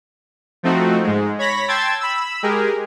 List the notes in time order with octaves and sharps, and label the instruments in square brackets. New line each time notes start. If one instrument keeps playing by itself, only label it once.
[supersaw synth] F3 A3 C4 D#4 F#4
G#2 G#3
C#5 B5 A#6 B6
G5 A5 C6 E6 G#6 A6
B5 E6
G#3 G4 G#4 A#4